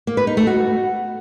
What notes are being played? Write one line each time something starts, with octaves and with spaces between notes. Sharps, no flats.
A#3
B4
D#4
A3
F#4